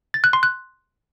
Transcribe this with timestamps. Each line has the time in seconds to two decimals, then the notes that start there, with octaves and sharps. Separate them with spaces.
0.14 A6
0.24 F#6
0.33 C6
0.43 F#6